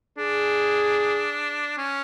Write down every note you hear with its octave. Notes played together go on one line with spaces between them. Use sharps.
D4 G#4
C#4